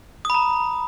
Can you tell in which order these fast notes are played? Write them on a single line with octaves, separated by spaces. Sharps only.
D#6 B5 A#5